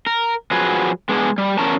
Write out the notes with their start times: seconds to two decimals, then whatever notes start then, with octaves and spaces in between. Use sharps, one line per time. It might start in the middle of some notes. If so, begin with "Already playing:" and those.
0.06 A#4
0.51 F3 F#3 F#4 G#4 B4
1.09 G#3 B3 D4 G#4
1.38 G3
1.58 E2 C#4 A#4 A5